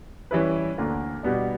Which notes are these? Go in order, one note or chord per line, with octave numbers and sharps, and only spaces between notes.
E3 G3 C#4 E4 B4
D2 D3 A#3
B2 G3 B3 D4